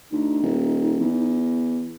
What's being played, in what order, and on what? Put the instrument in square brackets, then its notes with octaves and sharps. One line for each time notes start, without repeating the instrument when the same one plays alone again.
[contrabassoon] D2 [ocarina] D#4
[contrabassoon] D#1
E2